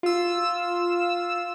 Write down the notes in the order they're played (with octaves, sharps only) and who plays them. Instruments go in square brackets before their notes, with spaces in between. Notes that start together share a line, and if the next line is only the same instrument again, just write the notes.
[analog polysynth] F4 E6